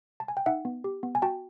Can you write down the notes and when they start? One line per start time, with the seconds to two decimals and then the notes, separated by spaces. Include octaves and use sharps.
0.20 A5
0.28 G#5
0.37 G5
0.46 D#4 E5 F#5
0.65 B3
0.84 G4
1.03 B3
1.15 G#5
1.22 F#4 G5 A5